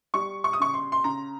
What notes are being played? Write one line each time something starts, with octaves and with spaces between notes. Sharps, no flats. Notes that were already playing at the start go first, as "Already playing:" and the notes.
G3 C#6
C#6
D#6
C#3 C#6
C6
C6
C#3 A#5